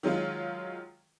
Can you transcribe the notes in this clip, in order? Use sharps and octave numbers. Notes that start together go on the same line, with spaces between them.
D#3 F#3 G#3 F4